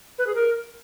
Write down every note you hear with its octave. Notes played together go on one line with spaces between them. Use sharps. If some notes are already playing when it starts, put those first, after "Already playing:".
B4
G#4
A#4